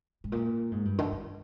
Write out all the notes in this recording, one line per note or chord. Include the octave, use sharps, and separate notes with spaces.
G#2
A#2
G#2
G2
D3
D3